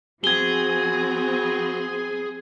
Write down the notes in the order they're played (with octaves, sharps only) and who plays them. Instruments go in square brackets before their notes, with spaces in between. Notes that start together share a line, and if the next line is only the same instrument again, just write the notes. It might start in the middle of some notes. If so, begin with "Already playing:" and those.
[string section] F3 B3 C4 [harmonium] F#4 [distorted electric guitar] G#4 [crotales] G#6 G7